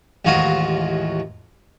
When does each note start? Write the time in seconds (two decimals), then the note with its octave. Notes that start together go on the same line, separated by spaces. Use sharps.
0.25 A1 D#2 G#3 F4 F#4 D#6